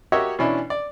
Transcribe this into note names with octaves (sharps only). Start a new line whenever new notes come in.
F#4 G4 A#4 C#5 D#5 E5
B2 E3 C#4 D4 E4
D5